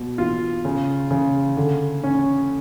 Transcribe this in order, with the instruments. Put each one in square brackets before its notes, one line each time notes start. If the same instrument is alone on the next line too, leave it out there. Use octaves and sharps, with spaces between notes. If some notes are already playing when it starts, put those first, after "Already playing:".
Already playing: [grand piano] B2
F4
C#3
C#3
D3
C#4